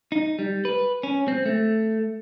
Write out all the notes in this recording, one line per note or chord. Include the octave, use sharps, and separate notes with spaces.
D#4
G3
B4
C#4
C4
A3